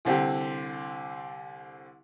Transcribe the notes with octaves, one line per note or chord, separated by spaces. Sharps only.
C2 D3 C4 G4